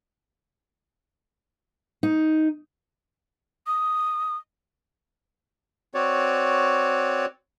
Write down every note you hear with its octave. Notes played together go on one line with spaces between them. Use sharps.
D#4
D#6
C4 F#4 C#5 D5